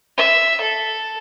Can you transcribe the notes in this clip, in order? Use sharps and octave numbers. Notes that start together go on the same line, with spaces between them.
E5
A4